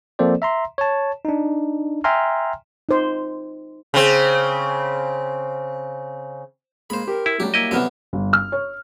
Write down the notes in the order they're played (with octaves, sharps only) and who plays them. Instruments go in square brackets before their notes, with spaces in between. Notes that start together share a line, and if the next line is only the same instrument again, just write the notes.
[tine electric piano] F3 A#3 C4 A4 C5 D5
E5 A#5 C6
C#5 A5
D4 D#4
E5 G5 G#5 A#5 C6 F6
[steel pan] D#4 C5
[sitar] C#3 C4
[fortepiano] G#3 [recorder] A#3 [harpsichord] C5 B5
[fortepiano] G4 [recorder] A#4
[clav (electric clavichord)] E4
[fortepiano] F#3 G3 [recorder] A3 [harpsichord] G4
[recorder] A#3 [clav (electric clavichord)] E4 D#5
[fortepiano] C2 F#3 F6 [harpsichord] E3 B3 A4
[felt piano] G1
F6
C#5